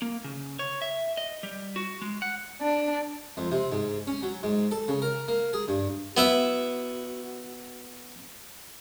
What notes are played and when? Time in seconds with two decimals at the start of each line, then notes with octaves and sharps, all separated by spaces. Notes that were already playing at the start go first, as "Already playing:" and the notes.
0.02 A#3
0.24 C#3
0.59 C#5
0.82 E5
1.17 D#5
1.43 G3
1.76 F#4
2.02 G#3
2.22 F#5
2.61 D4
3.37 F2
3.51 C3
3.72 G#2
4.07 C#4
4.22 F#3
4.43 G#2
4.71 A4
4.88 C#3
5.02 A#4
5.28 A#3
5.53 G#4
5.68 G2
6.17 B3 E4 F#4 E5